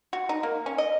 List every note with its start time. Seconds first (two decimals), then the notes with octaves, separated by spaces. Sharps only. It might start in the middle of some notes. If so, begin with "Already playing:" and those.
0.13 F#4
0.29 D#4
0.43 A#3
0.66 C#4
0.78 D#5